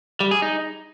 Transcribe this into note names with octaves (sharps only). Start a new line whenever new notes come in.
G3
G#4
D#4